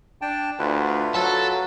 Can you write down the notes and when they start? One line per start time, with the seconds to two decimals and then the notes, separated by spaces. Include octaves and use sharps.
0.22 D4 G5 A5
0.59 D2 F4 B4
1.15 F#3 A4 A5